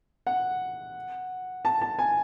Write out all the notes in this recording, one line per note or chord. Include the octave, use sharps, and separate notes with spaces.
F#5
A5
A5
G#5